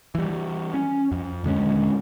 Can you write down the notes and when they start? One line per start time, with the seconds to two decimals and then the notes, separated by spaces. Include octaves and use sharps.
0.15 E3 G3
0.74 C#4
1.12 F2
1.44 D#1 D3 G#3 C#4